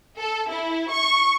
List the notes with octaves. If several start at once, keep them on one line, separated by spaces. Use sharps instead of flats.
A4
E4
C#6